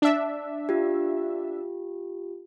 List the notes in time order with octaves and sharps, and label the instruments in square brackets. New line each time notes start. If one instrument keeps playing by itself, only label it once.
[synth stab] D4 E5
[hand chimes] F4 G4